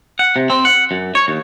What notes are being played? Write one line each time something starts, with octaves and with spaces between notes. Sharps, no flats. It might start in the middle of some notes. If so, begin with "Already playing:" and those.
F#5
C3
C4
F#5
F#2
C#5
D#2